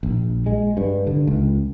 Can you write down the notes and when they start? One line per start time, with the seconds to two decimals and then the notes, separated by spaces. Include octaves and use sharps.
0.03 A#1
0.46 G#3
0.77 G2
1.07 D3
1.27 C#2